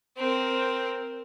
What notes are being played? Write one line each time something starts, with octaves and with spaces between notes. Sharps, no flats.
C4 A#4